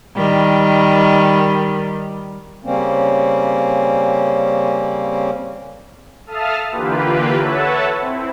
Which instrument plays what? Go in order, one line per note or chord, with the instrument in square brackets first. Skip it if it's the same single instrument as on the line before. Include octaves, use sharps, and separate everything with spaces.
[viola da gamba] D#3 G3
[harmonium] C#3 G3 A#3 C4 C#4
[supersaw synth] A4 E5 F5 A5 D#6 F6
D3 E3 A#3 F4 G4 B4
A4 B4 C#5 E5 F#5 A5
C4 E4